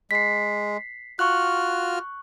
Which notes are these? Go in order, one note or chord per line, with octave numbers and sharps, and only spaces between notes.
G#3 B6 C7
F4 F#4 C#6 F6 F#6